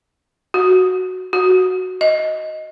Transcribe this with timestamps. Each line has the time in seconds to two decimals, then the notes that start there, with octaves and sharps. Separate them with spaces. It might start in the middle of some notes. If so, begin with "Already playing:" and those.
0.54 F#4
1.33 F#4
2.01 D#5